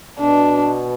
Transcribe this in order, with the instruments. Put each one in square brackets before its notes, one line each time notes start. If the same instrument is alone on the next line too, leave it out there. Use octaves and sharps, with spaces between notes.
[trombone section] B2 [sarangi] D4